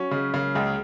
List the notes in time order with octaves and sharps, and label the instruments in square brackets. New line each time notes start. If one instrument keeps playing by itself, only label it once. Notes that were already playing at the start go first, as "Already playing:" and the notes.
Already playing: [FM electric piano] F#3 [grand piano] C#4
[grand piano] C#3 [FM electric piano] G#3
[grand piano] C#3 [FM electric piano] A#3
[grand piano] C#2 [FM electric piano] G#3